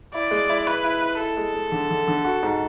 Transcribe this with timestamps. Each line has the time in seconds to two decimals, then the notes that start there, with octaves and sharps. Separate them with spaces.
0.14 E4 D5
0.31 G#3
0.49 E4
0.67 E4 B4
0.84 E4
1.02 E4
1.19 E4 A4
1.37 G#3
1.54 G#3
1.72 D3
1.90 D3
2.08 D3
2.25 F#4
2.43 G#2